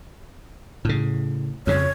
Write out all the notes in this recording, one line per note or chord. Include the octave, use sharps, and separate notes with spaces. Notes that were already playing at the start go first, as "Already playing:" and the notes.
A2 C#3
F2 C#3 C#5